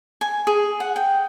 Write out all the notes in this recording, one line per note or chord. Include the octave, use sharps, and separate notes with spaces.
G#5
G#4
F#5
G5